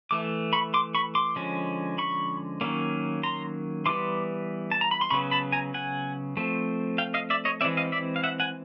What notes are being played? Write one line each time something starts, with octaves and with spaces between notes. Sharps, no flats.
E3 A3 D6
B5 C#6
C6 D6
B5 C#6
C6 D6
D3 F3 G#3 C#4
B5 C#6
D#3 F#3 A#3 C#4
A#5 C6
E3 G3 B3 C6 D6
A5
A#5
B5
C6
C#3 F#3 B3 B5 C#6
A5 B5
G#5 A#5
F#5 G#5
F3 A3 C4
F5 G5
D#5 F5
D5 E5
C#5 D#5
E3 G#3 C4 D5 E5
D#5 F5
D5 E5
F5
E5 F#5
F#5 G#5